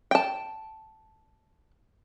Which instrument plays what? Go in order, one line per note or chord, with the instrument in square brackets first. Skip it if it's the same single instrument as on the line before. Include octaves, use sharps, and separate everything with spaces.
[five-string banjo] G5 A5